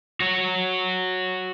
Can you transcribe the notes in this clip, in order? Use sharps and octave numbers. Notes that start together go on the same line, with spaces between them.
F#4 C#5